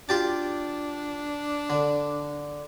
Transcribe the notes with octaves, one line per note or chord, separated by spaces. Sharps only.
D4 F4 G4 A5
D3